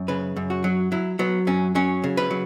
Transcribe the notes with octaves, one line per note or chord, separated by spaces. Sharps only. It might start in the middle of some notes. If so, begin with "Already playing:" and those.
Already playing: F#2
C#3 B4
F#2
F#4
F#3
F#3 E4
F#3 B3
F#2 C#4
F#3 C#4
C#3
B4
F#3